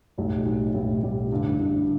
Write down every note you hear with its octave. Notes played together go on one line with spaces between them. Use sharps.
B1 A2 G3
B1 A2 G3
B1 A2 G3
B1 A2 G3
A1 G2 D3
A1 G2 D3